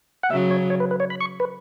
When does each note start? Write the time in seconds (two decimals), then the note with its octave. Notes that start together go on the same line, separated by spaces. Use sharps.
0.23 F#5
0.30 C#3 F#3 E5
0.51 C#5
0.70 C#5
0.80 B4
0.91 B4
1.00 C#5
1.10 B5
1.21 C#6
1.40 B4